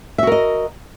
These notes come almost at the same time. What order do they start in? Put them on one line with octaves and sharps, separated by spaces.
E5 F#4 A#4 D#5